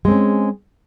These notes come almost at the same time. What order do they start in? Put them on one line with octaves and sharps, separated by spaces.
G#3 C4 C#4